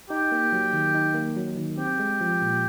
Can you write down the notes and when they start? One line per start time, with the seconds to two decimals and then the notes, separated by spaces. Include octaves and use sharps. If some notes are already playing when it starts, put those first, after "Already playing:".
0.10 D#4 G4
0.32 A#3
0.52 F#3
0.73 D#3
0.94 D#4
1.14 A#3
1.36 F#3
1.57 D#3
1.77 C4 G4
1.99 G#3
2.21 F3
2.42 A#2